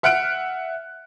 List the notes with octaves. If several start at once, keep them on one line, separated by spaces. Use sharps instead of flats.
E5 F#5 F6 F#6 D7